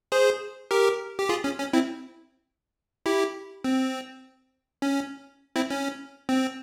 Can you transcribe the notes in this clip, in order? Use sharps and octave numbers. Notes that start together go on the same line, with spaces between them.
G#4 C5
G4 A#4
G4
F4 G#4
C#4
C#4
C4 E4
E4 G4
C4
C#4
C4 E4
C#4
C4